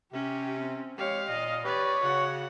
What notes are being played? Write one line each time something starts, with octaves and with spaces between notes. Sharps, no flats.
C3 C#4 G4
C4
G#3 G4 C#5 F5
A#2 D#5
G4 B4 C#5 D5
C#3 F#4 F#5